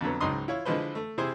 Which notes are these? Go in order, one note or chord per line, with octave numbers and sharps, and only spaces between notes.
F2 D3 F#3 B3
C#2 G#2 F#3 D#5 C6 D#6
E4 F4 C#5
D3 E3 F3 G#3 B4 C5
A3
C3 E4 G#4 C5